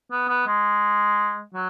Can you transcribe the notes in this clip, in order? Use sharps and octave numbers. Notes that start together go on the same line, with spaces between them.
B3
B3
G#3
F#3